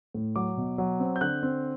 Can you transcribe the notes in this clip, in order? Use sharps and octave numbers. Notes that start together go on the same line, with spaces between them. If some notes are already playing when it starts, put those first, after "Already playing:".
A2
F#3 D6
B2
F#3
C4
G6
D3 F#6
C4